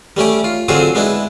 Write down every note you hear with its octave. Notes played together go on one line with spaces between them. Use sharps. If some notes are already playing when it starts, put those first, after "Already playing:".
G3 A3 C#4 G4
F4
D3 F#3 C4 F4 F#4 G#4
G#3 B3 D4 E4